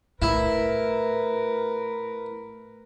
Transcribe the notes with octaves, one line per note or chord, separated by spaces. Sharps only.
A2 E4 A#4 B4